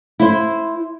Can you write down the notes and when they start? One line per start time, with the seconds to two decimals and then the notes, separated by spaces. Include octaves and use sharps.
0.20 E4 C5